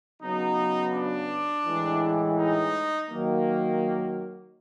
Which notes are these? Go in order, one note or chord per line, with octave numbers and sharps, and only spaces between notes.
C#3 F#3 B3 D#4
D4
A2 E3 G#3
D#4
D#3 F#3 A#3